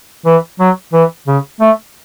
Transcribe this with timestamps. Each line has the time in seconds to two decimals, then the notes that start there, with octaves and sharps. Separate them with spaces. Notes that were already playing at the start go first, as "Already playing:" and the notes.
0.26 E3
0.60 F#3
0.93 E3
1.27 C#3
1.60 A3